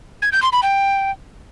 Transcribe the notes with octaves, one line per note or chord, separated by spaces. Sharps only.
G#6
G6
C6
B5
G5